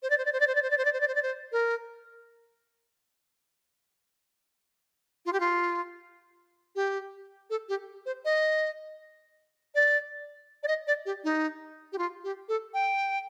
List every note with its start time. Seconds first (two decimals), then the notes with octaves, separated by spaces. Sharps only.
0.03 C5
0.10 D5
0.18 C5
0.25 D5
0.33 C5
0.40 D5
0.47 C5
0.55 D5
0.63 C5
0.71 D5
0.78 C5
0.85 D5
0.93 C5
1.01 D5
1.08 C5
1.15 D5
1.23 C5
1.52 A#4
5.26 F4
5.33 G4
5.40 F4
6.76 G4
7.50 A4
7.69 G4
8.06 C5
8.25 D#5
9.75 D5
10.63 D5
10.68 D#5
10.87 D5
11.06 G4
11.24 D#4
11.93 G4
11.98 F4
12.24 G4
12.49 A4
12.74 G5